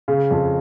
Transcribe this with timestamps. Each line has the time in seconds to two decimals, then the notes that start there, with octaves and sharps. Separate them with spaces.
0.08 C#3
0.31 F2